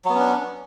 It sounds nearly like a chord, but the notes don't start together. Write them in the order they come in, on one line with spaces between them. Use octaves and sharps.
F#3 B3 C#4 D4